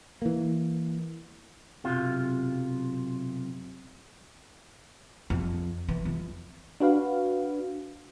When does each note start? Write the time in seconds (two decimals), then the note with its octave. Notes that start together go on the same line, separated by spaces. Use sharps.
0.22 E3 A#3
1.84 B1 F#2 C3 F4
5.30 F2
5.88 E3
6.05 F2
6.80 D4 F#4 B4 F5